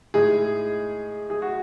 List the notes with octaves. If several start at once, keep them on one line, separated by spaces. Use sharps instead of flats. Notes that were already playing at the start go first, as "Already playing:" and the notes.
A2 G#3 D#4 G#4
G#4
F#4